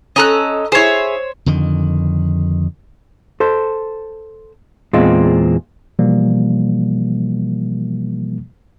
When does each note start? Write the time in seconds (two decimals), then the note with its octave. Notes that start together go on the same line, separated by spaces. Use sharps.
0.16 C#4 A4 D#5 A#5 F#6
0.72 E4 G#4 C5 C#5
1.46 F2 D3 D#3
3.40 A4 C5
4.93 E2 A#2 G#3 C4 F4
5.99 B2 E3 F3 G3 A#3